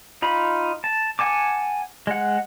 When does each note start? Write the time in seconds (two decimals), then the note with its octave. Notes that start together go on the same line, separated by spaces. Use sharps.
0.22 D#4 F4 B5
0.84 A5
1.19 F#5 G#5 A5 D6
2.07 G#3 F#5